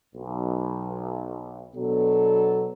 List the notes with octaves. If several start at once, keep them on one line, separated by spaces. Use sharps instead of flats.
B1
B2 F#3 B3 D4 A4